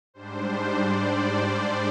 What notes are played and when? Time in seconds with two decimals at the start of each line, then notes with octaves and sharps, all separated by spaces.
0.14 G#2 G3 D4 C5
0.70 D5